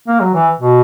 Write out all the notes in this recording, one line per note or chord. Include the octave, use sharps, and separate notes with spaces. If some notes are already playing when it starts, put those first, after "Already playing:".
A#3
F#3
E3
B2